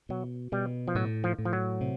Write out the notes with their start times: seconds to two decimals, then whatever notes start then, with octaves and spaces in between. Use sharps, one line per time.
0.09 B2 F#3
0.52 B2 G3
0.88 F3
0.95 A2 F#3
1.24 F3
1.38 A2
1.45 F3
1.53 F#3
1.81 C3